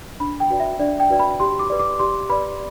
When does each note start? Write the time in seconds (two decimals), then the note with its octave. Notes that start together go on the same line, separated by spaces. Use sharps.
0.20 D4 B5
0.40 G5
0.50 F#4 B4 D5
0.60 E5
0.79 D4 D5
1.00 G5
1.10 F#4 B4 D5
1.20 B5
1.40 G4 C6
1.59 D6
1.70 B4 D5
1.79 D6
1.99 G4 C6
2.29 B4 D5 B5